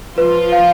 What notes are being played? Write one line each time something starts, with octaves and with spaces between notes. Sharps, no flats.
F3 F4 B4
F5